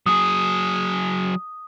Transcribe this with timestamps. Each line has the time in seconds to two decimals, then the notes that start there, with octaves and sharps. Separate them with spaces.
0.06 F#3 G#4 D#6